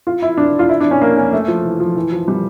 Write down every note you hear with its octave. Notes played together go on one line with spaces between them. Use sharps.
F4
E4
D4
F4
E4
D4
C#4
A#3
C#4
A3
F3
E3
F3
E3
F3
G3